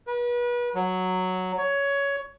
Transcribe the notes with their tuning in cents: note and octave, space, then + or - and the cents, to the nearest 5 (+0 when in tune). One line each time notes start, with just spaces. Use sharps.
B4 -35
F#3 +0
C#5 +15